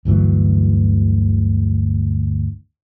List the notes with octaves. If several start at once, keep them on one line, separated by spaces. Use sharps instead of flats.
G1 D2 E3 F#3